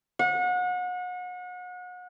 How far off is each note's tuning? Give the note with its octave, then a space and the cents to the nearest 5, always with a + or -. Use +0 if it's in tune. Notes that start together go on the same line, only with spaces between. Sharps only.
F#5 -35